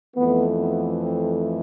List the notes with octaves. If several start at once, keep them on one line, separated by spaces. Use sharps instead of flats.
F2 E3 A3 B3
B3
C4